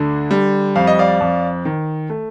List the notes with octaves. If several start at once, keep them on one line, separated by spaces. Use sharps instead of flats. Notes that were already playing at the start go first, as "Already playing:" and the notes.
Already playing: D2 D3
G3
F2 F5
D#5
D5 F5
F2
D#3
A3